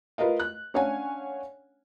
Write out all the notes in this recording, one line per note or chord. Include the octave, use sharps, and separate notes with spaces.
F4 A#4 B4 D#5 F5
F#6
C#4 D4 C#5 F5 F#5 G#5